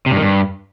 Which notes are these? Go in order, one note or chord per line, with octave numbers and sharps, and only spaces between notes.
C3
G2
D#3
G2